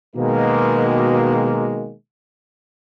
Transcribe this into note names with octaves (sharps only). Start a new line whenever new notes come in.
B2 D#3 G#3 A#3